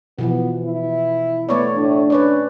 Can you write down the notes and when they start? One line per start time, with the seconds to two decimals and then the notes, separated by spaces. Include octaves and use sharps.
0.19 B2 E3 F3 B3
0.65 E4
1.49 A3 B3 C#5 D5
1.77 A2 D4
2.10 C#4 B4 C#5 D5